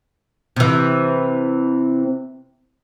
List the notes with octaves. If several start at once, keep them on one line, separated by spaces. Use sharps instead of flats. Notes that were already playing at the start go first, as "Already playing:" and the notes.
C3 E3